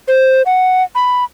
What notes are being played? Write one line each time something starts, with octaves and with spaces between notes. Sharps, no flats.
C5
F#5
B5